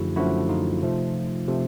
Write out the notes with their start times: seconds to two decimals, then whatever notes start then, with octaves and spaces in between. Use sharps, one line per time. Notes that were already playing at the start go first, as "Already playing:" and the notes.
Already playing: F#2 D3 F3 A3 E4 F#4 G#4
0.16 F#2 D3 F3 A3 E4 F#4
0.49 D#4 F4
0.83 C3 F3 A3
1.48 C3 F3 A3